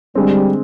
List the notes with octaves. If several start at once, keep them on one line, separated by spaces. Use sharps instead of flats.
D3 G3 G#3 C4